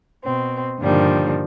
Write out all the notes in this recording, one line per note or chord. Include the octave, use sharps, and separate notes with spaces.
B2 C4
G2 A#2 D3 D#3 F3 G3